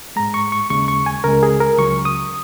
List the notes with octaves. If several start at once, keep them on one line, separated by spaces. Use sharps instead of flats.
G#2 G#3 A#5
C#6
C#6
D#2 C#3 G#3 C#6
C#6
G#5
C#2 C#3 G#3 A#4
G#4
A#4
C#2 C#3 F#3 C#6
D#6